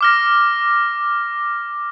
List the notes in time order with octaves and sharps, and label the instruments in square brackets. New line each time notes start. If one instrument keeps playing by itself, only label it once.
[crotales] D6 F6 A#6